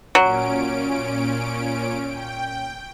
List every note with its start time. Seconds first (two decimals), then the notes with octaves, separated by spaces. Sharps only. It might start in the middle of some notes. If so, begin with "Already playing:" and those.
0.15 A#2 F#3 C#4 D7
2.07 G5